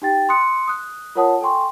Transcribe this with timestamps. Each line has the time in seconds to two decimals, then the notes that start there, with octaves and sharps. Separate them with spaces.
0.02 D#4 G4 G5 A6
0.29 C6 D#6 F#6 C#7
0.67 D#6 F#6
1.15 F4 A#4 C#5 F#5 A5 D#6
1.41 A4 G5 G#5 C6 C#6